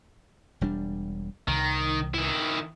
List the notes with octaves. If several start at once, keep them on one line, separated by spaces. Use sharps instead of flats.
E1 G3 D4
C2 D#3
D#3 E4